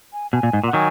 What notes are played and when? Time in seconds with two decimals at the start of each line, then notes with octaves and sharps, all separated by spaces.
0.13 G#5
0.33 B2 G#5
0.43 A#2
0.53 G#2
0.64 A#2
0.67 F#5
0.73 D#3 F#3 G#5